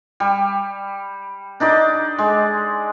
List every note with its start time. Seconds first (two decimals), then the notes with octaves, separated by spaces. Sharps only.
0.20 G3
1.60 D4 D#4 D5 D6
2.18 G#3